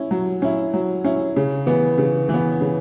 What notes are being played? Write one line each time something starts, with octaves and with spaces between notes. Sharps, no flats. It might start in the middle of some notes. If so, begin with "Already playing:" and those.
Already playing: C#4 E4
F#3
C#4 E4
F#3
C#4 E4
C#3
E3 B3
C#3
E3
B3
C#3